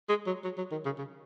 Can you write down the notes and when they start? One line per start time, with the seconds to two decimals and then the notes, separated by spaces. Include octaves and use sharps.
0.09 G#3
0.27 F#3
0.44 F#3
0.58 F#3
0.72 D#3
0.85 C#3
0.98 C#3